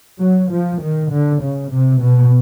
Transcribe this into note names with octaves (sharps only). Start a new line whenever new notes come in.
F#3
F3
D#3
D3
C#3
C3
B2